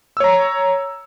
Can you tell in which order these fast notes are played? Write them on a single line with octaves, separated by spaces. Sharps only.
E6 C#5 A#5